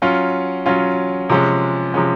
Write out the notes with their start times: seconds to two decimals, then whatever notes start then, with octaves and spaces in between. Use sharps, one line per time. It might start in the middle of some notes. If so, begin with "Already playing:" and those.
0.02 F#3 C#4 F4
0.66 F#3 C#4 F4
1.29 C3 F3 G#3 C#4
1.94 C3 F3 G#3 C#4